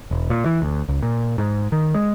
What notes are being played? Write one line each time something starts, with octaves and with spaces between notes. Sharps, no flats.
E1
A#2
E3
D2
C#2
A#2
G#2
D#3
G#3